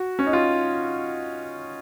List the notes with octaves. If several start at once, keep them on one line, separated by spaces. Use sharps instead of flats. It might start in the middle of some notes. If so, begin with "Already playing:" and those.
Already playing: F#4
C#4
D#4
F4